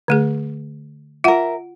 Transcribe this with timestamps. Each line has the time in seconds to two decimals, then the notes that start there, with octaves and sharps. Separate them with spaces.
0.08 D3 A3 G#4
1.24 F4 A#4 E5 F#5